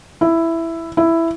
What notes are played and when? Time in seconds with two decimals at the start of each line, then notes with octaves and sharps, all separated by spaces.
0.21 E4
0.97 E4